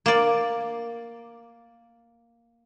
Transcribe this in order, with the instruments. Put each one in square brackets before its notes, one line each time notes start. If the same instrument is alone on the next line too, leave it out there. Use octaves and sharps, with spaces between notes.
[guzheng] A#3 D5